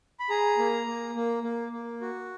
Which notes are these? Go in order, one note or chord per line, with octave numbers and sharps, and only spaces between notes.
B5
G#4 A#5
A#3
A#3
A#3
A#3
A#3
F#4